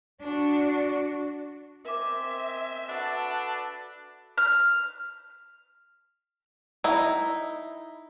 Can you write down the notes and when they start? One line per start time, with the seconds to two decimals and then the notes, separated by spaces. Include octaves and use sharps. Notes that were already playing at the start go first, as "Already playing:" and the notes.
0.22 D4 F#4
1.85 C4 A#4 D#5 E5 G#5 D6
2.89 D4 F#4 A4 B4
4.38 F6
6.84 D#4 E4